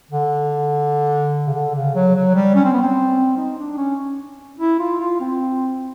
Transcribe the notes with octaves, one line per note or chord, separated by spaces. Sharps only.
D3
C#3
D3
C#3
F#3
F#3
G3
C#4
C4
B3
C4
D#4
D4
C#4
E4
F4
F4
C4